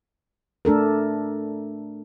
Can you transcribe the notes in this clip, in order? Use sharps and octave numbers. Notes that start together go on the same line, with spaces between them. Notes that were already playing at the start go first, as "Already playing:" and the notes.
A3 D4 A4 A#4